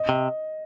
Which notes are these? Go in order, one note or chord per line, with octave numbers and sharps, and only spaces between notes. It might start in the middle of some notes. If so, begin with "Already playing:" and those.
Already playing: D#5
C3